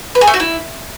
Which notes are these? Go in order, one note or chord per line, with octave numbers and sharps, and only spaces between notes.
B4
G#4
A3
F#4
E4